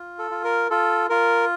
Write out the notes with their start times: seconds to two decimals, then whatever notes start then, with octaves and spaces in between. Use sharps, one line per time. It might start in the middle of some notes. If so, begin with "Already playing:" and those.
Already playing: F4
0.19 A4
0.31 F4
0.44 A#4
0.71 F4 A4
1.10 F4 A#4